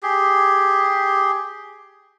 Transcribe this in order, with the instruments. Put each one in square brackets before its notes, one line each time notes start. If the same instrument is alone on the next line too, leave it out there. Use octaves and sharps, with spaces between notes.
[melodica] G4 G#4